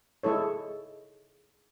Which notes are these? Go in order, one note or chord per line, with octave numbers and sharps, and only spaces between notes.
G#3 E4 A4 C#5